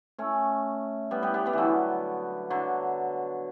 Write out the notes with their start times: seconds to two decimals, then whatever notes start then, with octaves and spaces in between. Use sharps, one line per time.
0.19 A3 C#4
1.11 G3 B3
1.22 G3 B3
1.34 G3 B3
1.46 G3 B3
1.53 D3 E3 F#3
2.50 D3 F#3